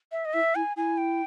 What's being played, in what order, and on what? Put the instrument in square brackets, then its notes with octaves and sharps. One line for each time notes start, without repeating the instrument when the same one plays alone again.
[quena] E5
D#5
[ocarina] E4 [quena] E5
[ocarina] E4 [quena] G#5
[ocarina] E4 [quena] G#5
[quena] G5